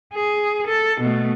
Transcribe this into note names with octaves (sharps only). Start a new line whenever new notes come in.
G#4
A4
B2 A3